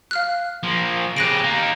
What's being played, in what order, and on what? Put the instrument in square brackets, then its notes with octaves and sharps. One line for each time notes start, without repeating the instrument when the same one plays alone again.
[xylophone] F5 F6 F#6
[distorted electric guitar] F3 A#3
[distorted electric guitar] C#3 G4 [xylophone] F#6 A#6 D7
[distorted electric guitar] A#3 D#4